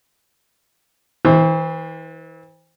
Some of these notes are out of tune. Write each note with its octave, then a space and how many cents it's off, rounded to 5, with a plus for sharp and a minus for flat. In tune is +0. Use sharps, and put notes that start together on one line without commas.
E3 -35 C5 +0